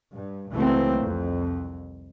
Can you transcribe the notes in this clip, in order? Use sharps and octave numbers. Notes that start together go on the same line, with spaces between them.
G2
C#2 E3 F#3 A3 A#3 C4
C2 F2